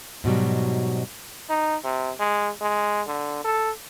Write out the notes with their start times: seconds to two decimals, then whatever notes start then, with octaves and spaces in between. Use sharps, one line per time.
0.24 G#2 B2 F#3 G3
1.50 D#4
1.84 C3
2.20 G#3
2.61 G#3
3.07 D3
3.45 A4